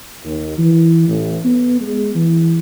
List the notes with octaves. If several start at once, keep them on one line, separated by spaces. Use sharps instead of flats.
D#2
E3
A1
B3
G#3
E3